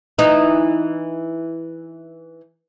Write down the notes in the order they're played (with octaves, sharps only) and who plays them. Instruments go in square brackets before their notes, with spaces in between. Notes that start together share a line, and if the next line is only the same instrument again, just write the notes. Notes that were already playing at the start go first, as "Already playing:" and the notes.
[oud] E3 D#4